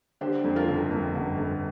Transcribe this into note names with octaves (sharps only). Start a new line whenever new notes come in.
D3 G4 C5
F2
F4 A#4
G1
F2
G1
G1